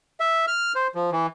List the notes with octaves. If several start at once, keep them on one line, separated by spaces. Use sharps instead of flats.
E5
F6
C5
F3
E3